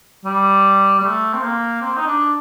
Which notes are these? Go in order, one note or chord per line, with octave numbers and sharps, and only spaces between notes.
G3
G3
A3
C4
A#3
C4
D#4
D4